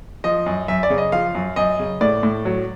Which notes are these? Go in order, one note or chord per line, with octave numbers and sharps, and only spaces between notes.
F3 D#5
F#2
F#2 E5
D5
C#3
D#5
F3 F5
F#2
F#2 D#5
C#3
A2 D5
A2
F#3